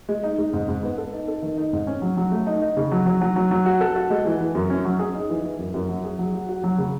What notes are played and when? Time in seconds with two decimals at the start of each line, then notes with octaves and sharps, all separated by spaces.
0.09 G#3
0.23 D#4
0.38 G#3
0.53 G#2
0.68 G#2
0.83 B3
0.98 A4
1.13 D#4
1.28 A4
1.42 D#3
1.57 D#4
1.73 G#2
1.87 C#4
2.02 F#3
2.17 F#3
2.32 A3
2.47 D#4
2.62 D#4
2.77 C#3
2.92 F#3
3.06 F#3
3.21 F#3
3.36 F#3
3.51 F#3
3.66 F#4
3.81 A4
3.96 F#4
4.10 G#3
4.25 E3
4.40 E3
4.55 F#2
4.70 C#4
4.85 F#3
4.99 G#4
5.15 D#4
5.30 E3
5.44 E3
5.59 F#2
5.74 F#2
5.89 F#3
6.04 G#4
6.19 F#3
6.34 F#4
6.49 F#4
6.64 F#3
6.78 C#3